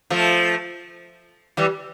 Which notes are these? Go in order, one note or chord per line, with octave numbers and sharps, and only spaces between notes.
F3 A3
E3 G3